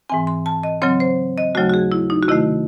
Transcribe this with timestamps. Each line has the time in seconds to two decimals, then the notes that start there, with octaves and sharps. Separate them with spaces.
0.09 G#2 E3 C4 G#5
0.27 C6
0.46 A5
0.63 D#5
0.82 C#3 F#3 C4 C#5
1.00 C5
1.38 D#5
1.55 D#2 C#3 F#3 A3 F#4
1.69 F#4
1.74 G#4
1.92 E4
2.10 D#4
2.23 F#4
2.28 C3 D#3 A3 E4